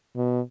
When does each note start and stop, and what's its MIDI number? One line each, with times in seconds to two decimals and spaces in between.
0.16 0.40 47